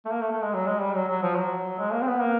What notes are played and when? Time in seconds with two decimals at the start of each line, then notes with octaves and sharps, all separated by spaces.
0.06 A3
0.11 A#3
0.22 A3
0.32 A3
0.42 G#3
0.54 F#3
0.67 G#3
0.82 G3
0.95 F#3
1.08 F#3
1.23 F3
1.36 F#3
1.79 G#3
1.92 A#3
2.02 C4
2.07 B3
2.21 A#3